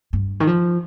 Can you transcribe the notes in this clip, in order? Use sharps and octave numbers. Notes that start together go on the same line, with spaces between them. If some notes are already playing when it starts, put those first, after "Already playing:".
G2
D#3
F3